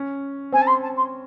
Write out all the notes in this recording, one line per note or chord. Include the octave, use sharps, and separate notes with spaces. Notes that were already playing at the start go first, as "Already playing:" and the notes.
Already playing: C#4
C4 G#5
A5
C6
A5
C6